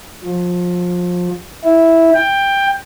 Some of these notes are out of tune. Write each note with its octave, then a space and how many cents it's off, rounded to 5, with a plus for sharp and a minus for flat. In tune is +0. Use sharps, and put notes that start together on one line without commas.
F3 +25
E4 -5
G5 +15